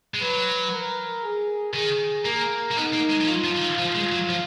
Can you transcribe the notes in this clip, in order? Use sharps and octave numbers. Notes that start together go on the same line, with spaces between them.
G#3
F#3 B4
A#4
G#4
D#3 G#4
A#3 A#4
A#3
B3 D#4
A#3
G#3
F3
F#3 F4
F3
D3
D#3
F3 F4
G#3
F#3
F3